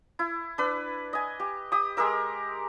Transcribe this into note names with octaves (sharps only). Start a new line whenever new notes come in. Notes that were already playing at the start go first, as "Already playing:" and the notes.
E4
D4 B4
D#5 G#5
G4
G4 D#6
G#3 G4 A#4 E5